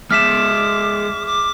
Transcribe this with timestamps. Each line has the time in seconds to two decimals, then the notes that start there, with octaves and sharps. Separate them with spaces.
0.11 G#3 E5 D6 F6 B6 E7
1.26 D6